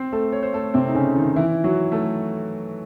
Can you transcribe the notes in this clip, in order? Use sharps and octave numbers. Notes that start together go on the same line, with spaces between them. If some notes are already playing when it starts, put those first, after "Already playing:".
Already playing: C4 C5
A3 A4
C#5
C5
A3 A4
C3 C4
D#4
C#3 C#4
D#3 D#4
E3 E4
F#3 F#4
A3 A4